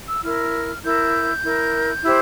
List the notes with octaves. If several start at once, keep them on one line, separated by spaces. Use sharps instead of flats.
E6
E4 A#4 F6
E4 A#4 G6
E4 A#4
E4 G4 C5